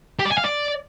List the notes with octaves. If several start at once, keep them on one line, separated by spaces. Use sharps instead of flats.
G4
D5
G#5
F5
D5